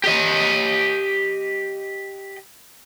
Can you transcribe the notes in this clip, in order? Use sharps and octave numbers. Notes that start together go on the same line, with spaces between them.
G4 D#5